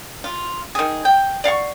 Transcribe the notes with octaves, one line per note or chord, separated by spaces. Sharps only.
F4
D#3 G#4
G5
D5 F5 F#5 C#6